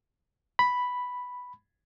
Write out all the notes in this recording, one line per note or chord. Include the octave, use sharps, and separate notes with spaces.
B5